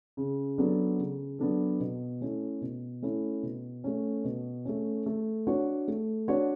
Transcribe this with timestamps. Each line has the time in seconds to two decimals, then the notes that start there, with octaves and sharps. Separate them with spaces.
0.17 C#3
0.58 F#3 B3 D4 A4
0.98 C#3
1.39 F#3 B3 D4 A4
1.80 B2
2.21 A3 C#4 E4 A4
2.61 B2
3.02 A3 C#4 E4 A4
3.43 B2
3.84 A3 C#4
4.24 B2
4.65 A3 C#4
5.06 A3
5.47 D4 F#4 C#5
5.88 A3
6.28 D4 F#4 C#5